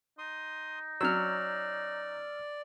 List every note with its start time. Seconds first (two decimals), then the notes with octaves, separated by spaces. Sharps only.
0.18 D#4 C6 D#6
1.01 F#3 C#4 D5 E6 F6